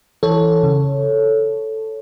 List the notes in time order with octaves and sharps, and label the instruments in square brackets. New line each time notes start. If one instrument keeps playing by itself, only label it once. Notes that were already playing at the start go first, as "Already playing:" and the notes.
[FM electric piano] E3 A4 C#5
C#3